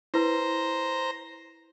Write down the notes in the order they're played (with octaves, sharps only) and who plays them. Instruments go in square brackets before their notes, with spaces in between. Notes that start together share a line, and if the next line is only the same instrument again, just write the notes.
[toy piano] E4 B4 [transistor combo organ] C5 A#5